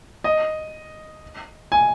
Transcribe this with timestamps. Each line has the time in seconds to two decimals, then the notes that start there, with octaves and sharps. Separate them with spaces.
0.24 D#5
1.72 G#5